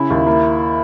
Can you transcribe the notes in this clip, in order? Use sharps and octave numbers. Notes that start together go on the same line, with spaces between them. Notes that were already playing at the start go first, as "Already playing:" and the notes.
Already playing: C#3 E4
D#2
A#3